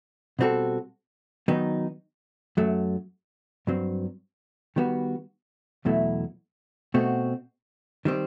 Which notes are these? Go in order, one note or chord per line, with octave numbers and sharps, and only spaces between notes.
B2 G3 C4 F#4 A4
D#3 F#3 B3 D#4
F#2 F#3 A3
G2 F#3 C4
D#3 G3 B3 F#4
E2 B2 F#3 A3 E4
B2 A3 C4 F#4
D#3 G3 C4